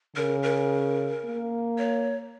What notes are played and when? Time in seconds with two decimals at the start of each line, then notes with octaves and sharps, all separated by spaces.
0.16 C#3 A#4
0.43 A#4
1.25 A#3
1.78 C#5